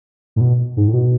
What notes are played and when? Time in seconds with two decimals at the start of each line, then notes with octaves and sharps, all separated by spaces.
0.36 A2
0.41 B2
0.77 G#2
0.88 A2
0.93 B2